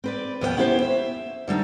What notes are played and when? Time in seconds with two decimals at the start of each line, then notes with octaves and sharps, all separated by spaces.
0.04 C4 B4 D5
0.41 D#2 F3 B3 C#5 G5
0.57 B3 C#4 E4 G4 B4 C5
0.83 E5
1.48 D3 G3 A3 D#4